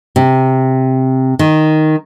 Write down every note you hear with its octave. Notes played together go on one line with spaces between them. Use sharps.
C3
D#3